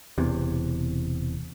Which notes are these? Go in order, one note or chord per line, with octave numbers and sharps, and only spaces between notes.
E1 E2 C3